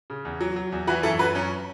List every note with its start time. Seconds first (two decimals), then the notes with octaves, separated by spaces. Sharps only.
0.10 C#3
0.25 E2
0.41 F#3
0.56 F#3
0.72 E2
0.87 E3 F#4 B4
1.03 F#2 E4 A4
1.19 F#2 F#4 B4
1.35 F#2 C#4